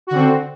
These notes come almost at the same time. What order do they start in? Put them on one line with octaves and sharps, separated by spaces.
F#4 D3 C4